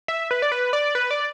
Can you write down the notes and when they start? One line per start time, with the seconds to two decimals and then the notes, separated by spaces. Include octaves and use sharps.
0.08 E5
0.31 B4
0.42 D5
0.52 B4
0.73 D5
0.95 B4
1.11 D5